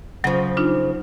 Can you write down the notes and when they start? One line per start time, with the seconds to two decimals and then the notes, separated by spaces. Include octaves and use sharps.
0.24 C#3 F3 F#3
0.57 D4 D#4 F4